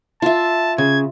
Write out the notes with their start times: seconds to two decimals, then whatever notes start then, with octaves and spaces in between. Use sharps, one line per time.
0.22 F4 E5 A5
0.78 C#3 G#6